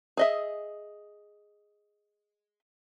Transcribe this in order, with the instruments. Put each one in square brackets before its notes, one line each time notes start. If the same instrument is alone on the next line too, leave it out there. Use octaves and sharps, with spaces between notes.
[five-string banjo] G#4 D#5 E5